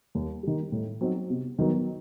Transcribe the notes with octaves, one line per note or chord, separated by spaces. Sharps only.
D#2
D#3 G3
A2
F#3 C4 D#4
C3
D#3 F#3 B3 D#4